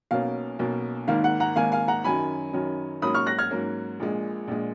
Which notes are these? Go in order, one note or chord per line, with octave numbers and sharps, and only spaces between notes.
B1 B2 A#3 C#4 F5
B1 B2 A#3 C#4
G#1 G#2 D#3 A#3 F5
F#5
F#5 A#5
G#1 G#2 D#3 A#3 F5 G#5
F5 G#5
F#5 A#5
F#2 D#3 F#3 C#4 G#5 B5
F#2 D#3 F#3 C#4
G#2 F#3 A#3 C#4 B5 D#6
C#6 F6
F#6 A#6
F6 G#6
G#2 F#3 A#3 C#4
A#1 A#2 G#3
A#1 A#2 G#3